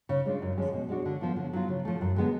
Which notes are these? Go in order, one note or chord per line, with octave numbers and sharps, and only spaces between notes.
C#3
G#3 D4 F4
F#2
D3 F3 G#3 C#4
B2
G#3 D4 F#4
D3
F3 B3 F4
D3
F#3 B3 F4
C#3
F3 A3
F#2
D3 G#3 B3